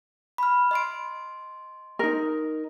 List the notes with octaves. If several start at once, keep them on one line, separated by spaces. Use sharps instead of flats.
B5 F6
D#5 C6 D7
D#4 A#4